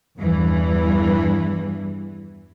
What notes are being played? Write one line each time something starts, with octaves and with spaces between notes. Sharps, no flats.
E2 G2 E3